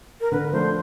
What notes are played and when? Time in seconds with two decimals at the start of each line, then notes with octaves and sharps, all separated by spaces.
0.21 A#4
0.32 D3 B4
0.52 F3 A3 D4 C5